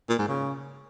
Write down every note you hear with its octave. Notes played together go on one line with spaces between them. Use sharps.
A#2
G#2
C#3